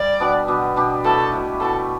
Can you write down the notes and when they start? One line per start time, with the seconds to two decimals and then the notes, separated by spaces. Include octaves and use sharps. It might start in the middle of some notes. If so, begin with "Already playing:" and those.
Already playing: G3 D5
0.20 B2 B3 D4 G4
0.48 B2 B3 D4 G4
0.76 B2 B3 D4 G4
1.04 B2 A3 E4 A4
1.32 B2 A3 E4
1.60 B2 A3 E4 A4